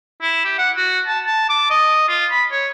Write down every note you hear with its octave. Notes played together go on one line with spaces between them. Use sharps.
E4
G4
F#5
F#4
A5
A5
D6
D#5
F4
B5
C#5